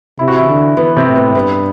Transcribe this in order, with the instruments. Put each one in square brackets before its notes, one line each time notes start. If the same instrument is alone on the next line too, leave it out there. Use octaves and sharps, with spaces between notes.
[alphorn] C3 [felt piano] E4
[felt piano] F#4
E3 E4
[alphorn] D3
[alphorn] E3 [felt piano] B3
[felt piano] C3 C4
[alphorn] A2
[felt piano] B3
[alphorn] G2 [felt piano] B3